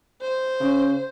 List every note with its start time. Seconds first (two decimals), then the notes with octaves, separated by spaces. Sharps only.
0.21 C5
0.60 C#3